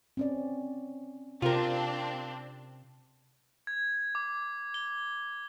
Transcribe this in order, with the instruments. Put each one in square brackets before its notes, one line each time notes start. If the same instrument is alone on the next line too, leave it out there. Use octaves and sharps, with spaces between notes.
[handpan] C4 C#4 D5
[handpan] C3 [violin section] C4 D4 [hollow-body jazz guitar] F4 A#4
[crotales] G#6
D6
G7